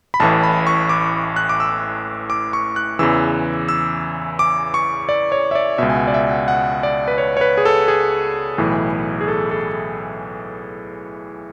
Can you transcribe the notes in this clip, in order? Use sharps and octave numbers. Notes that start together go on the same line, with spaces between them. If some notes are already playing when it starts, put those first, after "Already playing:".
B5
A1 A2 E3 A5
B5
C#6
D6
F#6
D6
E6
D6
C#6
F#6
E2 C#3 E3 E6
E6
D6
C#6
D5
C#5
E5
D5
C#2 B2 E5
G#5
F#5
D5
E5
F#5
F#5
D5
B4
C#5
C#5
B4
G#4
A4
G#4
B1 A2 E3
G#4
A4
A4